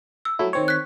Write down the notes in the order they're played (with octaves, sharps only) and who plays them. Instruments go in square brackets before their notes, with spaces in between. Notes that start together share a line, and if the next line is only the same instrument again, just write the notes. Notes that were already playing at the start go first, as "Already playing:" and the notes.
[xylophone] E6
[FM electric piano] F#3 A3 E4
D#3 C4 C#5
[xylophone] F#6 B6